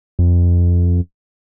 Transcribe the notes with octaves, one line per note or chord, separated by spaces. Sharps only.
F2